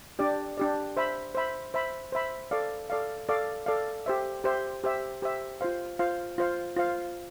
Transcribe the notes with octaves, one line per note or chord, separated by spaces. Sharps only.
D4 G4 D5
D4 G4 D5
C5 E5 B5
C5 E5 B5
C5 E5 B5
C5 E5 B5
A4 D5 F5
A4 D5 F5
A4 D5 F5
A4 D5 F5
G4 C5 E5
G4 C5 E5
G4 C5 E5
G4 C5 E5
F4 C5 F5
F4 C5 F5
F4 C5 F5
F4 C5 F5